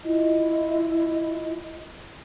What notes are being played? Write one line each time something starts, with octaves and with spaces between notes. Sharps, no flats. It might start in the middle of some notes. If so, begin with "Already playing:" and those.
E4 F4 D#5